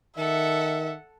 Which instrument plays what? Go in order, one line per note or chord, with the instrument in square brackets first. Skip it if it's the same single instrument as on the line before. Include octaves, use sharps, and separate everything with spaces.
[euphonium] D#3 [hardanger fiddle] A4 F#5 [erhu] E5